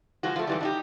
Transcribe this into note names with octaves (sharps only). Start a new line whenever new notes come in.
F3 G#3 F#4
F3 A3
G#2 E3 G3
D4 D#4 G4